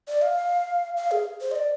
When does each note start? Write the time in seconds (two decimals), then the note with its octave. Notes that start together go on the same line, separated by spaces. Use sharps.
0.08 D5
0.23 F5
0.97 F5
1.11 G#4
1.41 C5
1.52 D#5
1.56 D5